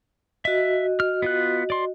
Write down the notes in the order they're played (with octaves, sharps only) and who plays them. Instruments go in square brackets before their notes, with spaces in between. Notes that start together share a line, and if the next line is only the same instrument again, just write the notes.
[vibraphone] F#4 D#5 [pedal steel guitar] E5
[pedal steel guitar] F6
B3 F4 F#6
D5 C6